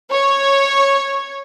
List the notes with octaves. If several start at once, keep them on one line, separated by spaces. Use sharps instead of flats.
C#5